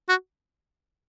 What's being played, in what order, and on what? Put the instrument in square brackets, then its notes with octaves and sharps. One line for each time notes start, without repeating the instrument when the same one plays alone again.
[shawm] F#4